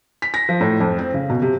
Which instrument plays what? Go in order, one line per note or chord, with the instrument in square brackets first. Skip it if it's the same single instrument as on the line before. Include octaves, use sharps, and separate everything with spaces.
[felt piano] B6
A#6
F3
A2
F2
C4
C#3
B2
C3